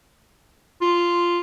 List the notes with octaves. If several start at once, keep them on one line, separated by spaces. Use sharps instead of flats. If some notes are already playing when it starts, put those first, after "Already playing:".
F4